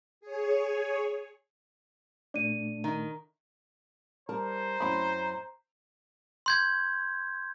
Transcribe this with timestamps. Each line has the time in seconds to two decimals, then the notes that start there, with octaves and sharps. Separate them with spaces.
0.21 G#4 C#5
2.34 A#2 A3 D4 D5 D#7
2.84 D#3
4.29 G3 A#4 C5 A5 A#5
4.80 F#2 C4 E4 B5 C6
6.46 C6 G6 G#6